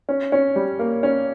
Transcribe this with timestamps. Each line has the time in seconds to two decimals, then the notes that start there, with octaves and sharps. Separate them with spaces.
0.09 C#4
0.32 C#4
0.56 G3
0.79 A#3
1.03 C#4